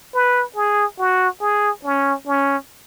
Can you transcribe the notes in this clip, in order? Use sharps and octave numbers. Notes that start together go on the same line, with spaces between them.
B4
G#4
F#4
G#4
C#4
C#4